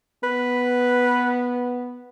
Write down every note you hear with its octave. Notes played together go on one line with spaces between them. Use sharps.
B3 B4